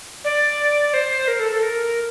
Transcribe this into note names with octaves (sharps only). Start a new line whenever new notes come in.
D5
C5
A#4
A4
A4
A#4